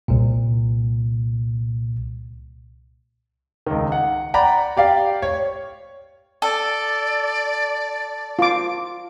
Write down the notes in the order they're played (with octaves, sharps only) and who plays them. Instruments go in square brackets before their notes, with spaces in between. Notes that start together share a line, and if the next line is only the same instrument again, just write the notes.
[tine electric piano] C2 A#2
[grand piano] C#2 D#3
F#5
D5 F#5 G5 A#5 B5
G4 D5 F5 G5
C#5
[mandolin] A4 [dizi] D5
[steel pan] F4 D6